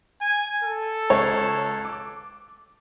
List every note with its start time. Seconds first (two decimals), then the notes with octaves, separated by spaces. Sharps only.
0.21 G#5
0.64 A4
1.10 C#2 C#5
1.85 D6